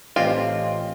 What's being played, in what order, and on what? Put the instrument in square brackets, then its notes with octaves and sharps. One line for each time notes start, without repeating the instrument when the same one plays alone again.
[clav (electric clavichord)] A1 C4 G4 [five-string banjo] F4 [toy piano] D5 D#5 F5